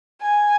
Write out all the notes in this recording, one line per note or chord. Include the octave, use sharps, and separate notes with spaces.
G#5